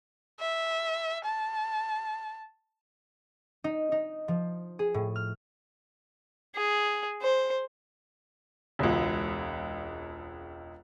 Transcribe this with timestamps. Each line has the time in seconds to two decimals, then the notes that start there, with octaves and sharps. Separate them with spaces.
0.40 E5
1.25 A5
3.64 D#4
3.92 D#4
4.28 F3
4.79 G#4
4.94 A2
5.16 F6
6.56 G#4
7.22 C5
8.79 E1 C#2